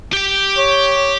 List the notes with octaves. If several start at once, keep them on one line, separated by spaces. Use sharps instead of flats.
G4 G5
C#5